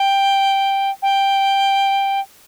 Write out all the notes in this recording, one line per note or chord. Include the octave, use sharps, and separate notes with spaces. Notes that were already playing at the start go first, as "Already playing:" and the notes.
Already playing: G5
G5